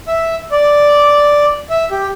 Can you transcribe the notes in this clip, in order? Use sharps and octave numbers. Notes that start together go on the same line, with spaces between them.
E5
D5
E5
G4